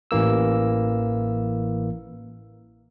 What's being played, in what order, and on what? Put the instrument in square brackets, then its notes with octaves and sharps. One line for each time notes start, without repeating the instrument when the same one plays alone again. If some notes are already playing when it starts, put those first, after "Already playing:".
[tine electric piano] A1 E3 A#3 E6